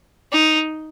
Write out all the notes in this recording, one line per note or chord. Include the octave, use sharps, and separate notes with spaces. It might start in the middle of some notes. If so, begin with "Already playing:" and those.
D#4